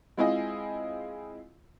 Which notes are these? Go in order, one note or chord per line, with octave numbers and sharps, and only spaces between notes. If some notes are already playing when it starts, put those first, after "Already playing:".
G#3 C4 E4 F4 G#4 D#5